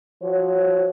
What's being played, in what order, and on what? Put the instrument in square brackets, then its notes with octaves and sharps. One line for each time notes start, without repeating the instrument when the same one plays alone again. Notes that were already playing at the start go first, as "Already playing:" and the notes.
[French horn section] F3 F#4 C#5